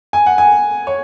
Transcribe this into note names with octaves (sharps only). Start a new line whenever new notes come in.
G#5
F#5
G#5
C#5